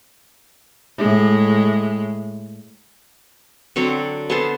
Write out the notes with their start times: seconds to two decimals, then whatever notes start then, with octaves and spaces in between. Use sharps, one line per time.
0.98 A2 G#3
3.76 D3 F#3 C4 C#5
4.30 B3 G#4 A4 C5